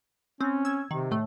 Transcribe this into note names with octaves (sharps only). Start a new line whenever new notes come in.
C4 C#4
E6 G#6
C3 D#3
A2 A3